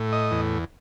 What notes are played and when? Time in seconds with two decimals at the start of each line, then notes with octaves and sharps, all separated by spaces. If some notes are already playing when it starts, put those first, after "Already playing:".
Already playing: A2
0.13 D#5
0.31 E2